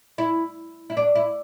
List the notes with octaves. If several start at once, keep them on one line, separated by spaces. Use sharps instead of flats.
E4
E4
D4
E4